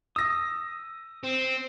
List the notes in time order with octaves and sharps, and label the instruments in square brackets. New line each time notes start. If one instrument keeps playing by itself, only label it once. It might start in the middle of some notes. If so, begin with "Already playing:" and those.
[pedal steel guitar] D#6 [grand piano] E6 A#6
[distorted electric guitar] C4